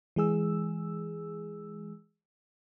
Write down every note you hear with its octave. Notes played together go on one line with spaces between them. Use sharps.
E3 G#3 G#4 E6